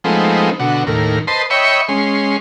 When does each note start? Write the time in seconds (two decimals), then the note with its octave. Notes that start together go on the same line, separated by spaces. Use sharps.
0.04 F3 G#3 A3 B3 C4 D#4
0.59 B2 D3 F#4
0.87 D#2 A2 A#4
1.27 B4 C5 D#5 A5 C6
1.50 C#5 D#5 E5 G5 B5 C#6
1.88 G#3 C#4 C6